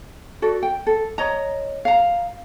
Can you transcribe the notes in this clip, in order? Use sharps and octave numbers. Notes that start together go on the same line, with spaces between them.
F#4 A4 D5
G5
A4
C#5 D#5 A#5
F5 A#5